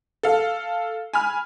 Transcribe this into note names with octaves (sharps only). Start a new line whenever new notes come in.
A4 F5
G#5 B5 F6